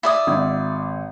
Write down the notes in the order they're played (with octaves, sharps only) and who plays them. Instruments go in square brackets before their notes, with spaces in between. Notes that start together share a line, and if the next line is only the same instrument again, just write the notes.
[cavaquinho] E4 D5 D#6
[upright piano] G#1